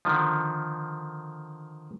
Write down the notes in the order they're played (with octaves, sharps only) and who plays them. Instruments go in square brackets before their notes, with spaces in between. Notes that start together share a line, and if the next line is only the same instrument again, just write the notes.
[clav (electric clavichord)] D3 D#3 F3